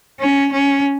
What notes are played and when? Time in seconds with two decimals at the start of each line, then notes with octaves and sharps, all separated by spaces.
0.20 C#4
0.53 C#4